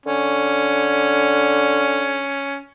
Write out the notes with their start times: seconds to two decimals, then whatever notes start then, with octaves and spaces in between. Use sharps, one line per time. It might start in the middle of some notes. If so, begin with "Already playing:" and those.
0.06 D3 C#4